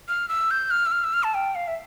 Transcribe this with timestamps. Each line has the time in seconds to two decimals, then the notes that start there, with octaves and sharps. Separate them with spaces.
0.08 F6
0.29 E6
0.51 G6
0.71 F6
0.86 E6
0.92 F6
1.04 E6
1.13 F6
1.23 A5
1.34 G5
1.55 F5
1.67 E5